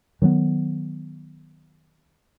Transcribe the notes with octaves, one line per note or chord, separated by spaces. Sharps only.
D#3 F#3 G3 B3